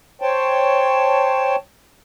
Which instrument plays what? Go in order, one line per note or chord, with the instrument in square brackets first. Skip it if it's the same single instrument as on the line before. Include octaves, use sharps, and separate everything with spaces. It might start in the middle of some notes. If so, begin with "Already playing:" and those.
[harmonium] C5 C#5 G5 A5